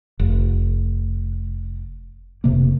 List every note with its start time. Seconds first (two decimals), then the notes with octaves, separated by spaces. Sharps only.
0.19 F1
2.44 F1 C3 A#3